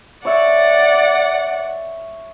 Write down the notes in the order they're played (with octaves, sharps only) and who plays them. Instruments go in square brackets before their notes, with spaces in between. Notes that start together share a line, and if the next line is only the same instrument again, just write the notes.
[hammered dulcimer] C#5 E5 [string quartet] D5 F#5